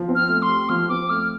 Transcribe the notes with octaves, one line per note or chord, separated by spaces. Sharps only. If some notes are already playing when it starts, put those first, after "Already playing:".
Already playing: F3
C4
F6
A3
C6
G4
F3 F6
C4 D6
A3 F6